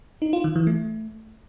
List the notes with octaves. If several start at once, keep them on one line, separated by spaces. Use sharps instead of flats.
D#4
F4
D#3
E3
A3